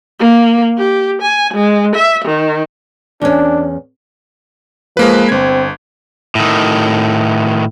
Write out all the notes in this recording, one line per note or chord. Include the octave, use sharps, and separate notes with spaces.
A#3
G4
G#5
G#3
E5
D#3
E2 C#4 D4
F3 G#3 A#3 B4
G1 C4 G#6
A2 D#3